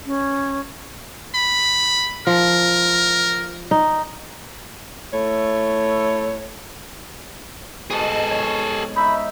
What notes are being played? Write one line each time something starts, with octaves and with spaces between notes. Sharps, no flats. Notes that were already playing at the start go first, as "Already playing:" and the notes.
C#4
B5
F3 A#4
D#4
A3 E4 C#5
G#2 B2 G#4 A4
C#5
D#4 E5 B5